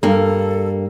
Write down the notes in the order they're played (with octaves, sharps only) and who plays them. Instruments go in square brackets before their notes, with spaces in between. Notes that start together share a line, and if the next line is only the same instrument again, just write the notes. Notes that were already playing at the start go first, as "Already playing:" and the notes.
[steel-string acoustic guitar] G2 A#3 [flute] A4